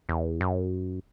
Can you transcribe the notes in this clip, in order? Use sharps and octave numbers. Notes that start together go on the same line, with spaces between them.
E2
F#2